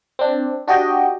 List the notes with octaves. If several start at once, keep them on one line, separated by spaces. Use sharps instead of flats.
C4 D4
D4 F#4 G4 D#5 G5